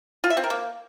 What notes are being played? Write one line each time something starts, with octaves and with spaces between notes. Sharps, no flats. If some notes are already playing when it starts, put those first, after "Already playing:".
F4
E5
C4
A#4
A#3